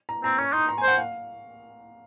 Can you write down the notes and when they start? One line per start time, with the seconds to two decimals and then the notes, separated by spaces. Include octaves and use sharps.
0.09 A#5
0.24 C4 A#5
0.38 C#4 C#6
0.53 D#4 C6
0.69 A#5
0.78 G#5
0.83 C5 F#5
0.98 F5